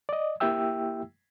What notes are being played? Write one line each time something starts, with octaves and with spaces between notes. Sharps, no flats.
D5 D#5
A#3 E4 G4 E5 G5 E6